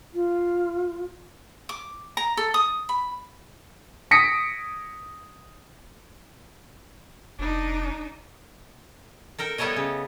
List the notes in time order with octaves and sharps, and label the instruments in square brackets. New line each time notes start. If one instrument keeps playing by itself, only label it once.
[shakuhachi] F4
[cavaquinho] D6
A#5
A4
D#6
B5
[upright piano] D#6 A#6 B6 C#7 D7
[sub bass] F1 [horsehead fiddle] D4 D#4
[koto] A4 A#4 G5
G3 B3 E4 A4 C#5 D#5
C#3